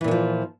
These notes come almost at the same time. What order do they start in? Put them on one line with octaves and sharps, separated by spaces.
E3 A#2 D3 F3